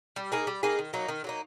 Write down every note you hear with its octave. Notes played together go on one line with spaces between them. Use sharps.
G3
A#3 D#4 G#4
G3
A#3 D#4 G#4
D#3
F#3 A#3 D#4
D#3
F#3 A#3 D#4